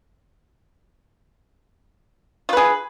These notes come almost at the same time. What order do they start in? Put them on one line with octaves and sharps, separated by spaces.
F4 B4 G#4